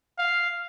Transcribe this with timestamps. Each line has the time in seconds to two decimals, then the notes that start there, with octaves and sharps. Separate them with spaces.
0.18 F5